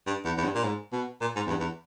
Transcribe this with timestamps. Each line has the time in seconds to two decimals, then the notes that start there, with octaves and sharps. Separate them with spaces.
0.07 G2
0.25 E2
0.37 E2
0.44 G2
0.55 A#2
0.64 G#2
0.92 B2
1.21 A#2
1.36 G#2
1.46 E2
1.50 G2
1.60 E2